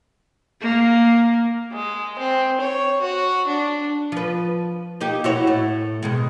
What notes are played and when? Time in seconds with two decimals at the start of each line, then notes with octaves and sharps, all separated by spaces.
0.61 A#3
1.72 G#3
2.18 C4
2.61 C#5
3.01 F#4
3.47 D4
4.12 F3 B4
5.01 A#3 D#4 G4
5.24 E4 F#4 C#5
5.47 A2
6.03 B2 D#3 G#3